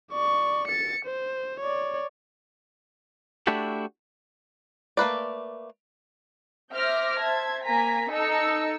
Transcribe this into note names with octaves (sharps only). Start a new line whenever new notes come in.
D5 C#6
A6 C#7
C5
C#5 D5
A3 D4 E4 F#4 G4 A4
A3 A#3 B4 D5
C5 E5 D6 F6 G6 A#6
C5 E5 A5 G#6
A#3 G#5 A#5 B6
D#4 A4 E6 C#7